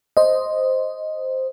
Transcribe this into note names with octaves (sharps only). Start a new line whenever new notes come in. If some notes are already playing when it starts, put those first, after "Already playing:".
C5 D#5